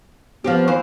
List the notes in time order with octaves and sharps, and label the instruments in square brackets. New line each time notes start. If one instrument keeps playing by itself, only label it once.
[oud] F3 C4 G4 [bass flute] B3
[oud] D#2 E3 C5